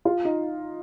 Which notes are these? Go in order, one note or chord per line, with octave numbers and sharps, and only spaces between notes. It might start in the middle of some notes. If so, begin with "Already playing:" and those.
F4
D#4